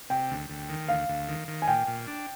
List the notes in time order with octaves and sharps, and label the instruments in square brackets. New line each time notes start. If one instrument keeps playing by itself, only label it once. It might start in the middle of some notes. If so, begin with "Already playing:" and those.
[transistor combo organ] C3 [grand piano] G5
[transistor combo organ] D2
D2
D#3
[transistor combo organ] D2 [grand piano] F5
[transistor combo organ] D2
D#3
D#3
[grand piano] G#5
[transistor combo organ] A#2 [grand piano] G5
[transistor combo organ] A#2
D4